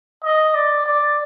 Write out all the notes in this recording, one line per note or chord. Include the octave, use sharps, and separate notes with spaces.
D#5
D5
D5